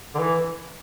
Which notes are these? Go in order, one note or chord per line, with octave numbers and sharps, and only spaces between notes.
D3
E3